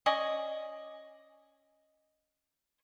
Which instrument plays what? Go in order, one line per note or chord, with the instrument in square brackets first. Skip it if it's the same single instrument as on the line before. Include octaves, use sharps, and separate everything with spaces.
[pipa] C#4 D5 D#5 G#5